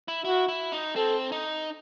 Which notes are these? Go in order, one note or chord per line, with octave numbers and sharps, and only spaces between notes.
E4
E4 F#4
E4
D#4
C4 A4
D#4